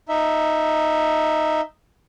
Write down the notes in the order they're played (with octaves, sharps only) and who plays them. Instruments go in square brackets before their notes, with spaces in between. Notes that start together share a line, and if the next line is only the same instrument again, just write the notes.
[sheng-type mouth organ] D#4 E5